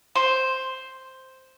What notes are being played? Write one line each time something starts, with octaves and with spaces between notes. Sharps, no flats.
C5